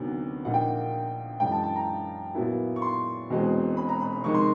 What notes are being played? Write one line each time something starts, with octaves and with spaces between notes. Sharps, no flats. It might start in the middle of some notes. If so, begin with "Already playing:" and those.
Already playing: D2 C3 D#3 F#3 B3
A#1 A#2 F3 A#3 D#4 F#5
G5
F#5
F#2 C#3 E3 G#3 G5
A5
A5
A#5
A#2 F#3 B3 E4
C#6
C6
E1 E2 B2 G#3 C4
B5
A#5
B5
F2 C3 D#3 G#3 C#6
C6